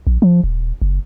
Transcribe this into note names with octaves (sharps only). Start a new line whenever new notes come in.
A#1
F3
D#1
F#1